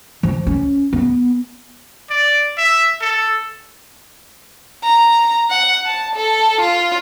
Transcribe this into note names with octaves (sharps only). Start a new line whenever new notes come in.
F3
C#4
B3
D5
E5
A4
A#5
F#5
A5
A4
F4